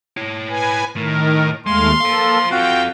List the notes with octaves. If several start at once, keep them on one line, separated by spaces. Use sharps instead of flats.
E4 C#5
B4 G#5
A2 D#3 A#4
D#2 G#3 A3 F5 C6
A#3 A4 C5 F5
C4 F4 F#4 A4 G5